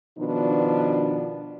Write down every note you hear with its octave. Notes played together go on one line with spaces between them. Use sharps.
B2 D#3 F3 D4